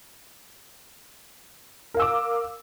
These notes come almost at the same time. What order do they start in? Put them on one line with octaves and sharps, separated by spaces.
A#4 F5 E6 D6